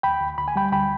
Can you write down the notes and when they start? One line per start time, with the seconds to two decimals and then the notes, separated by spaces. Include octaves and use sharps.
0.03 D2 G5 B5
0.20 D2
0.38 D2 B5
0.48 G#5
0.56 G3 G5 B5
0.72 D2 G5 B5